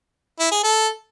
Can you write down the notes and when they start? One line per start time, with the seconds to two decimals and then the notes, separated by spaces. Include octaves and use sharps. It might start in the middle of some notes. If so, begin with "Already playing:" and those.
0.40 E4
0.52 G#4
0.63 A4